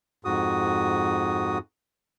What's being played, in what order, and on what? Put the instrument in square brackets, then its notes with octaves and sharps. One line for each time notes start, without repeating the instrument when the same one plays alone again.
[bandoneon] F2 G#2 F#4 D#6